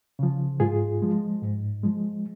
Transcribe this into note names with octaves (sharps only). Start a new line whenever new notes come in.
C#3 F3
G#2 F4 G#4
F3 G#3
G#2
F3 G#3